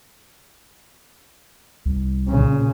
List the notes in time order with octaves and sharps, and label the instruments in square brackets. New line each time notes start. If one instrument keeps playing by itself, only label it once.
[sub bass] C2
[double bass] A#2 C#3